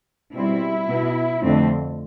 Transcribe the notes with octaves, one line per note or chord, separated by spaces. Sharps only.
B2 G3 C4 E4
B2 B3
F2 D3 A3 C4